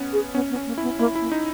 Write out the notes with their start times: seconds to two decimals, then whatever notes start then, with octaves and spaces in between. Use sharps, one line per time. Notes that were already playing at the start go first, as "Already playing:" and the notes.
Already playing: B3 C#4
0.13 G#4
0.34 B3 C#4
0.50 B3
0.56 C#4
0.67 A#3
0.78 E4
0.83 B3
0.99 A#3 E4
1.15 E4
1.21 A#3
1.32 D#4